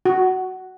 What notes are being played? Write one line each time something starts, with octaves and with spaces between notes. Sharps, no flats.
F#4